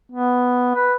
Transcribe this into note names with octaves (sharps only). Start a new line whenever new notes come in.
B3
B4